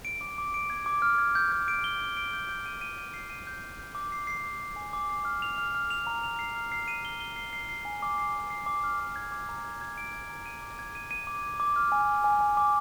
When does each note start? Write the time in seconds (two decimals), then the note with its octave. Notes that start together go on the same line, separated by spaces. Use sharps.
0.05 D7
0.21 D6
0.38 D6
0.54 D7
0.70 G#6
0.86 D6
1.02 F6
1.18 G#6
1.35 G6
1.52 G6
1.68 D7
1.84 G7
2.00 G6
2.17 D7
2.33 G6
2.49 G6
2.66 D#7
2.81 D#7
2.98 D#7
3.14 C7
3.30 D#7
3.47 G6
3.63 G6
3.79 G6
3.95 D6
4.12 C7
4.27 C7
4.44 D6
4.60 D6
4.76 G#5
4.93 D6
5.09 C7
5.25 F6
5.42 F7
5.58 F6
5.75 F6
5.90 F7
6.07 A#5
6.24 F7
6.39 C7
6.55 F6
6.72 C7
6.88 D#7
7.05 G7
7.20 G7
7.36 C7
7.53 C7
7.69 C7
7.85 G#5
8.02 D6
8.18 C7
8.34 D6
8.50 C7
8.66 D6
8.84 F6
9.00 D6
9.16 G#6
9.32 D6
9.49 A#5
9.65 G#6
9.81 G#6
9.98 D7
10.13 G#6
10.30 A#5
10.46 D#7
10.62 D6
10.79 G#6
10.95 D#7
11.11 D#7
11.27 D6
11.43 G#6
11.60 D6
11.76 F6
11.92 G#5
12.09 F6
12.24 G#5
12.41 G#5
12.57 D6